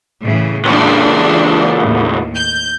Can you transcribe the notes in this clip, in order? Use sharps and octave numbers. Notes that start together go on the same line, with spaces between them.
A2 C#3 E3
C#2 A#2 E3 D4
D#2 A2
G6